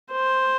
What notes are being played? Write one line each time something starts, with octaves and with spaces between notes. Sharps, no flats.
C5